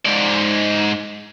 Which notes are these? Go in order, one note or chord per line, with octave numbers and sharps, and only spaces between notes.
G#2 D5